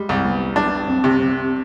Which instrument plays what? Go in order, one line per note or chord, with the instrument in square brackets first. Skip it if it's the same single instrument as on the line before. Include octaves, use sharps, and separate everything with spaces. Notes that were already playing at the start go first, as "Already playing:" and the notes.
Already playing: [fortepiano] G3 [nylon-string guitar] G#3
[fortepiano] C2
[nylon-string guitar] B3
[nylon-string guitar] B3 [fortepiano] D4
[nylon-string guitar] C4
[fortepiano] C3
[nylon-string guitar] C4